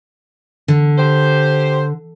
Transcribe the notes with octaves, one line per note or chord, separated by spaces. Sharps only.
D3
G4 C5